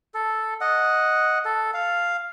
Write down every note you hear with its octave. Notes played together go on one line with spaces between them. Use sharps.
A4
D#5 F#5
A4
F5